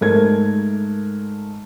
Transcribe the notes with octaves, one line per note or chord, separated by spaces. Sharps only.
G#2 A3 A#4 G#6